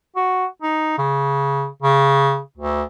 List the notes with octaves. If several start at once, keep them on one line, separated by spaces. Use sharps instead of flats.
F#4
D#4
C#3
C#3
D2